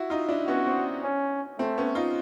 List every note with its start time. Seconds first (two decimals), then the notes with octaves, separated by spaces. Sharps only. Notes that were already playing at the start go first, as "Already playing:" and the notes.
Already playing: E4 F#4
0.10 D#4 F4
0.29 D4 E4
0.47 B3 C#4 F#4
0.67 C4
1.03 C#4
1.59 A3 C4
1.78 B3 C#4
1.95 D#4 F4